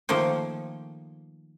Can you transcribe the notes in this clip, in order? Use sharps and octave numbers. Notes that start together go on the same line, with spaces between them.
D#3 F3 A3 A#3 G5